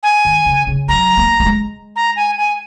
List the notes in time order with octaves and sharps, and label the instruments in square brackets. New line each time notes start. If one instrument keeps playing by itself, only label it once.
[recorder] G#5
[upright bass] D#3
C#3
C#3
[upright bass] F#3 [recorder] A#5
[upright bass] A#3
A#3
G#3
[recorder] A#5
G#5
G#5